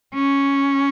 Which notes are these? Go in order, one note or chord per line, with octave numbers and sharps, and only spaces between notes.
C#4